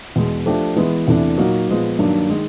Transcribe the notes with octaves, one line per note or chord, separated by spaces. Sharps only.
E2 B2 G#3
F3 A3 D4 G4
E3 G#3 B3 E4
E2 C3 E3 A3 D4
A#2 F#3 A#3 D#4 F#4
A#2 F3 G#3 B3
G2 D#3 F#3 A#3 D4
D#3 G#3